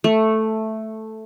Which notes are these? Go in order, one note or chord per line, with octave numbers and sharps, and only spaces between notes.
A3